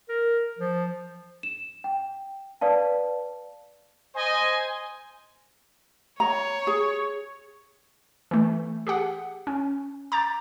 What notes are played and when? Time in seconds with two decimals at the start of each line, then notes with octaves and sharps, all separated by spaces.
0.09 A#4
0.59 F3
1.43 E7
1.84 G5
2.61 B4 D5 F5 A5
4.15 C5 D#5 G#5
6.20 C#5 A#5
6.67 G#4
8.31 E3 A3
8.87 G4 G#4 F#5
9.47 C#4
10.12 A#5 D6 G6 A6